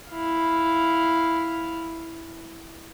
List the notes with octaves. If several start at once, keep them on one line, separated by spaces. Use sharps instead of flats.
E4 F5